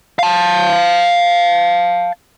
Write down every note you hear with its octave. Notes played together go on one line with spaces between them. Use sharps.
F5 A5